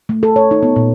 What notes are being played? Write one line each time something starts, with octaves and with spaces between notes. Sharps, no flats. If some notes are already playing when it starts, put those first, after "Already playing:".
A3
A4
C#5
D#4
B3
A#2